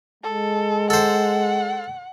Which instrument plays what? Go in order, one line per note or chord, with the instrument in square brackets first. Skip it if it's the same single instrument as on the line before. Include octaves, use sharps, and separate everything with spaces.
[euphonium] G#3 [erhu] A4
[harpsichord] A4 C5 [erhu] F#5